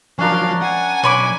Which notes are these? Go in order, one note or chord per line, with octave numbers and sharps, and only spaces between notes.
F3 F#3 C#4 D4 A#4 F5 C6
F#5 G#5
B1 C#5 B5 D6